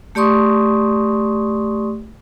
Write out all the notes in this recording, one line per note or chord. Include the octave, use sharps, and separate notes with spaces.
A3 G4 D5 C6 C#6 D#6